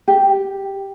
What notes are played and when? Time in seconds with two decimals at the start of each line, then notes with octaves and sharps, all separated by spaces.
0.08 G4